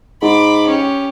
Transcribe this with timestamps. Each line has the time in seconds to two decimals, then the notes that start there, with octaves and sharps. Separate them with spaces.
0.22 G#2 B5 D6
0.67 C#4 G4